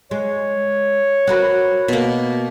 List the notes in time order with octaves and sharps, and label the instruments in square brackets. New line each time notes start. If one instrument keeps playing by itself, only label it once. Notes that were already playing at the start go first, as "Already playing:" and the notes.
[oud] G#3 [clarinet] C#5
[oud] F#4 A#4 B4
[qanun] B2 A#3